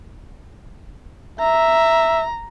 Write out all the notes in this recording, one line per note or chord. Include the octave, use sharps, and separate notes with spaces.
E5 A#5